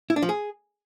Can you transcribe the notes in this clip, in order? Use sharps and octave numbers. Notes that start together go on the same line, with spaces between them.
E4
D4
F3
G#4